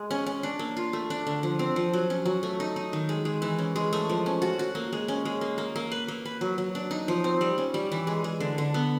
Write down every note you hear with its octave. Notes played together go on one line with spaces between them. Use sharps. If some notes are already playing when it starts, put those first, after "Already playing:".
Already playing: G#3
C#4
C#4
D4
A#3
F4
A3
D4
D3
F3
C4
F3
F#3
C#4
F#3
A3
D#4
D#4
D#3
G#3
G#3
E3
C#4
G#3
A3
F3
C#4
F#4
F#4
A#3
G#3
C#4
G#3
A#3
A#3
A#3
B4
A#3
B4
F#3
F#3
D4
D#4
F3
C4
G3
C#4
G3
E3
G#3
G#3
D3
D3
B3